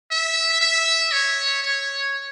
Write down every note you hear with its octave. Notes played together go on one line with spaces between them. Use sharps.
E5
E5
C#5
C#5